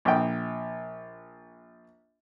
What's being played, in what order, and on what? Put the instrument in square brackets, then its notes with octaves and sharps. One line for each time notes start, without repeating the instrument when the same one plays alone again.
[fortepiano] A#1 G5